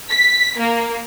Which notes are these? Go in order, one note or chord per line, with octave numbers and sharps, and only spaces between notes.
B6
A#3